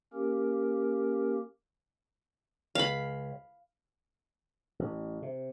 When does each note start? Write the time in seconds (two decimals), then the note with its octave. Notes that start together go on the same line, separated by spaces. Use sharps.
0.13 A#3 C#4 G4 A#4
2.75 C#2 F5 B5
4.79 A1
5.22 C3